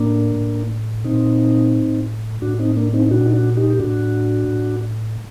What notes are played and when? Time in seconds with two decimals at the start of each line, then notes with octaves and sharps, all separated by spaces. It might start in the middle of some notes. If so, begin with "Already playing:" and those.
Already playing: A2 A#3 D4
0.36 A2
1.05 A#2 C4 D#4
1.73 A2
2.42 A2 D4 F#4
2.59 C4 D#4
2.77 A#3 D4
2.93 C4 D#4
3.06 D#4
3.11 A#2 D4 F#4
3.26 D#4
3.33 D4 F#4
3.57 D#4 G4
3.70 G4
3.80 A2 D4 F#4
4.48 A2